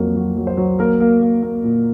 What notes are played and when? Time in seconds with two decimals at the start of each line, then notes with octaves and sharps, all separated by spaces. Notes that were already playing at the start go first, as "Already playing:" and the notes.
Already playing: F2 F#3 A#3 A#4
0.16 F#3
0.37 F#3
0.47 C5
0.57 F#3
0.79 A#3 A#4
1.00 A#3
1.22 A#3
1.43 A#3
1.64 A#2